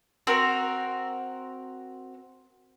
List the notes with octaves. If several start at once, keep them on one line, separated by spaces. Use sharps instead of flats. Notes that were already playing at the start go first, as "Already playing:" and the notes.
C4 F#4 A#4